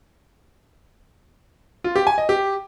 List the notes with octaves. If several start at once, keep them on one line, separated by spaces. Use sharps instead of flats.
F4
G4
G#5
D#5
G4